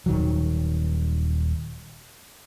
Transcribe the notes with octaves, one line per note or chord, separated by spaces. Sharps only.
D#1 D#3 F#3